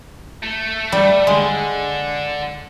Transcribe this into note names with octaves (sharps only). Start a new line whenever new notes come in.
A3
G3
D3 G#3